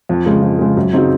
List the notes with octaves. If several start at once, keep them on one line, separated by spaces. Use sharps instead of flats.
F2
C#3 G#3
F2
C#3 G#3
F#2
C#3 F#3 C4 D#4